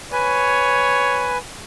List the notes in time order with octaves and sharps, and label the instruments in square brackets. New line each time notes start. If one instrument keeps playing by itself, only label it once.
[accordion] B4 G#5 [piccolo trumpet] C#5